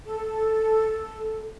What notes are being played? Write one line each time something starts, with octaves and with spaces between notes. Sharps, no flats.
A4